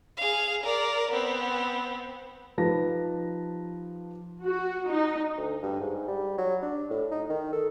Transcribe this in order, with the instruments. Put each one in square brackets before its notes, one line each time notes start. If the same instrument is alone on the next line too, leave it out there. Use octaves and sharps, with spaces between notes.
[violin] G#4 F5
A#4 D5
B3 C4
[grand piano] F3 D#4 G4 B4 A5 A#6
[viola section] F#4
D#4
[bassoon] D2
G2
G#2
G3
F#3
D4
A2
D#4
D#3
A4